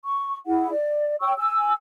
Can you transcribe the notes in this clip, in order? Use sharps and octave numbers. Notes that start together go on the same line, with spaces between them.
C#6
E4 G#4 F#5
D5
C#5 G5 C#6 E6
G#5 E6